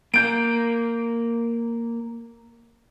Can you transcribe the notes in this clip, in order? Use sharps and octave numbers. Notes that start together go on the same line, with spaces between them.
A#3 A#4 G6 D7